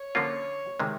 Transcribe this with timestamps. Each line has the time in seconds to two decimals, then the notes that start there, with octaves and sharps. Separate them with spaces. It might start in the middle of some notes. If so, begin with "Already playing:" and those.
Already playing: C#5
0.15 D3 F3 A#3 C#4 F4
0.80 C3 D#3 G#3